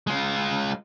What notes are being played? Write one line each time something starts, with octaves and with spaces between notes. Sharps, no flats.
G#3 F4